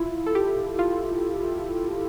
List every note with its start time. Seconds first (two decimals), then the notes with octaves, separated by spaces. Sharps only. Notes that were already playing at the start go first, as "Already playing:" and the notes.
Already playing: E4 F4
0.26 A4
0.35 G4
0.79 F4